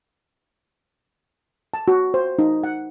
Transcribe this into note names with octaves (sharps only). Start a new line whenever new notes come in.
A5
F#4
C5
D#4
F#5